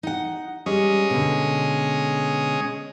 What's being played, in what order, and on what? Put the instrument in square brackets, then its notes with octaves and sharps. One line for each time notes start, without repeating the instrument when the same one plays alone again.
[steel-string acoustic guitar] D#4 F#5
[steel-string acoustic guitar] G3 [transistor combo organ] G#3 C#4 D#5
[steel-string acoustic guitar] B2 D3